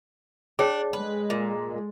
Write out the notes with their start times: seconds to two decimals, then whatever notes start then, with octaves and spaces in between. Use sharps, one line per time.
0.59 D4 G#4 C#5 G5
0.93 G#3 B4
1.30 A#2